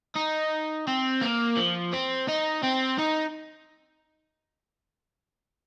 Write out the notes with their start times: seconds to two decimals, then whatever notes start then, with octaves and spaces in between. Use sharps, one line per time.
0.16 D#4
0.87 C4
1.22 A#3
1.57 F3
1.93 C4
2.29 D#4
2.63 C4
2.99 D#4